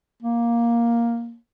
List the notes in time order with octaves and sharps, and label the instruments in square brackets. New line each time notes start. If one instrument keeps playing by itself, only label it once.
[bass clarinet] A#3